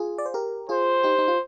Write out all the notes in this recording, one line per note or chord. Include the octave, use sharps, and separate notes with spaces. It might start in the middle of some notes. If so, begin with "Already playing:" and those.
Already playing: F4 G#4
D5
C5
G4 A#4
F4 G#4 C5
D#4 G4
D#4
F4